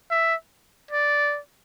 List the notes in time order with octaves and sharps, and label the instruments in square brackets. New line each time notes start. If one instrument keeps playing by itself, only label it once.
[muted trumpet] E5
D5